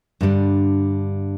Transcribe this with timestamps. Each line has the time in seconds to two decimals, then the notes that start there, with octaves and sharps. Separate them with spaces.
0.21 G2 D3 G3 D4